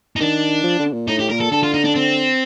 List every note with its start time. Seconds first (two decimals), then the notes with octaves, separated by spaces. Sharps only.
0.16 D#4
0.20 D#3 D4
0.64 F3
0.79 D3
0.93 A#2
1.08 A2 D#4
1.19 G4
1.30 A#2 A#4
1.40 A4
1.51 D3 A4
1.63 F4
1.74 D#4
1.85 D4
1.95 C4